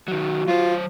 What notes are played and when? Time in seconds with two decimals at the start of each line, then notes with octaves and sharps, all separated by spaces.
0.08 D#3 F#3 F#4
0.48 F#3 F4 C5